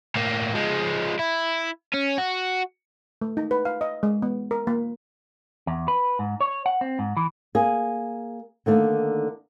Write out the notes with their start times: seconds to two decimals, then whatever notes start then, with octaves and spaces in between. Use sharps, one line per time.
0.16 A2 A#3
0.55 F3 G#3
1.19 E4
1.94 C#4
2.18 F#4
3.21 A3
3.37 D#4
3.51 B4
3.65 F5
3.81 D#5
4.03 G#3
4.22 B3
4.51 A#4
4.67 A#3
5.67 E2
5.88 B4
6.19 G#2
6.41 C#5
6.66 F#5
6.81 C4
6.99 G#2
7.17 E3
7.55 A#3 G#4
8.66 D3 D#3 A3 A#3